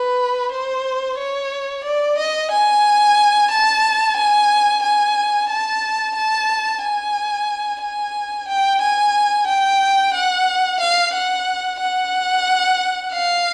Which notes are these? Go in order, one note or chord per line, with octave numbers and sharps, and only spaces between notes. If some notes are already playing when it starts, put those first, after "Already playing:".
Already playing: B4
C5
C#5
D5
D#5
G#5
A5
G#5
G#5
A5
A5
G#5
G#5
G5
G#5
G5
F#5
F5
F#5
F#5
F5